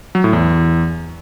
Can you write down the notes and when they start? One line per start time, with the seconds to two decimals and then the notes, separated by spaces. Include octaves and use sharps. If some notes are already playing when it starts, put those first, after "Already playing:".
0.15 F#3
0.24 A2
0.33 E2